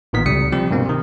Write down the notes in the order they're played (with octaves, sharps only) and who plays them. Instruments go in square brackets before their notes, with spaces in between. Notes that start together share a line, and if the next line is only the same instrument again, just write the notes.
[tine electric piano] A1 A#2 D#3 B3 B6
C#2 C3 G3 D#6 C#7
C3 F3 G3 C4 G4
G2 B2 A#3 C4
C3 D#3